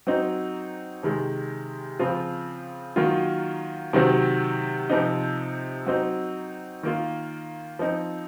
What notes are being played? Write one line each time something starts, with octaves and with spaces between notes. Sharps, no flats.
F#3 C4 D#4
C3 D#3 G#3
C#3 F3 C4 F4
D#3 F#3 A#3 F4
C3 D#3 F#3 C4
C3 F3 C4 D#4
F#3 C4 D#4
D#3 A#3 F4
F3 C4 D#4